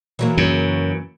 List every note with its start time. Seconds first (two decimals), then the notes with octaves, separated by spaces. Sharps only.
0.19 E3 F#3 A#3
0.37 F#2 C#3